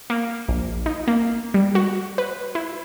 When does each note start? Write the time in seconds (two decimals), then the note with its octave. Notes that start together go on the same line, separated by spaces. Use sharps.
0.10 A#3
0.49 A#1
0.86 D#4
1.08 A#3
1.54 G3
1.75 F#4
2.18 B4
2.55 E4